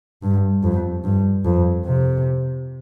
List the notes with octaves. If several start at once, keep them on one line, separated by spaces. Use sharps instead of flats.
G2
F2
G2
F2
C3